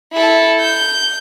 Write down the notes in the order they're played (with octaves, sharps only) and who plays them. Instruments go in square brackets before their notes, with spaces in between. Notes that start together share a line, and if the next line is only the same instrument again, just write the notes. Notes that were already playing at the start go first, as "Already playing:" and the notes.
[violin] E4 A4
G6